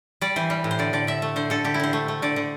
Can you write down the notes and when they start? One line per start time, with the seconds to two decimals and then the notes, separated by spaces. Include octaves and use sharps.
0.21 G3 D5
0.36 E3 C5
0.50 G3
0.64 A2
0.71 C5
0.79 D3 D5
0.93 D3 D5
1.07 D3 E5
1.22 A3
1.36 D3 C5
1.50 D3 A4
1.64 D3 G4
1.74 E4
1.80 D3 C5
1.93 A3
2.08 A3
2.22 D3 D5
2.36 D3